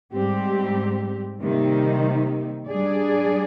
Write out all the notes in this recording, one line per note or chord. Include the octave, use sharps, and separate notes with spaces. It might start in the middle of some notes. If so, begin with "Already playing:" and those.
G#2 G3 C4 G4
C3 D#3 G3 A#3 D#4
G3 D4 G#4 D5